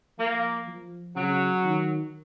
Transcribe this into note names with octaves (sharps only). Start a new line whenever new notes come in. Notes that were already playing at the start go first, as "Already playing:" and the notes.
F3 A#3
F3
C#3 F#3
D#3